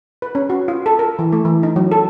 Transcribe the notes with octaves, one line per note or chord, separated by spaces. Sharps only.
B4
C#4
F#4
F4
A4
A#4
E3
A3
E3
D#4
F#3
A4